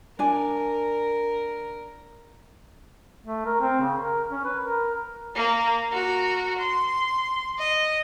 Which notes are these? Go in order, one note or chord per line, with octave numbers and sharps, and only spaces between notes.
D4 A#4 G#5
A3
A#4
C4
C#3
A#4
C#4
B4
A#4
A#3 A#4
F#4 A#4
C6
D#5